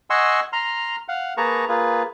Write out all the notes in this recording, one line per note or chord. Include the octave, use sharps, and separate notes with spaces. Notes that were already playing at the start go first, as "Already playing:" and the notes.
D#5 F#5 G#5 C6 C#6 E6
A#5 C6 F6
F5 F#5
A#3 G#4 B4 A5 A#5 C#6
A#3 F4 G#4 B4